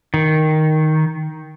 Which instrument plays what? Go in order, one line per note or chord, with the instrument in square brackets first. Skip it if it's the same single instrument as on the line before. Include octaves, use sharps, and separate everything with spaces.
[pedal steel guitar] D#3